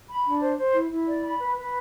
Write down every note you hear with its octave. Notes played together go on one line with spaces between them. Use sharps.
B5
D4
C5
C5
E4
E4
D5
B5
B4
B4